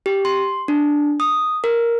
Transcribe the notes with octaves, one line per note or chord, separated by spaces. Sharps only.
G4
C6
D4
D#6
A#4